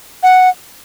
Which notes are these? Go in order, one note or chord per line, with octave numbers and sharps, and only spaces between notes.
F#5